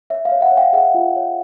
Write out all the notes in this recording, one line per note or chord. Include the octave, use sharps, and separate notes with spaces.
C#5 E5
F5
C#5
E5 F#5
C#5
F5 G5
G#4 E5 F#5
F4
C#5